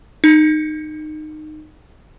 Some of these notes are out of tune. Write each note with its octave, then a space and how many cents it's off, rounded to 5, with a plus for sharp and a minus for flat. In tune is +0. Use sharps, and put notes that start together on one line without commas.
D#4 -20